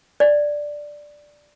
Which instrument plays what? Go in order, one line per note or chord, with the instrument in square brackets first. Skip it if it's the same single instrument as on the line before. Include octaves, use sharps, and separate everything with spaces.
[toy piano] D5